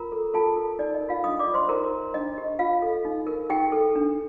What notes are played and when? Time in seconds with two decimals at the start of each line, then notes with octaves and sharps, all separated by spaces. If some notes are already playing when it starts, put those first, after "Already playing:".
Already playing: F4 A#4 A#5
0.12 A4
0.34 F4 A4 A5
0.57 A#4
0.79 D#4 D5
0.95 D#5
1.01 A#4
1.09 F4 F5
1.24 D4 D#5 D#6
1.39 D5 D6
1.47 F4
1.54 C5 C6
1.69 D#4 A#4 A#5
1.92 A#4
2.14 D4 D#5
2.38 G4
2.59 F4 F5
2.82 A4
3.05 D#4
3.27 A#4
3.50 D#4 G4 G5
3.72 A4
3.95 D4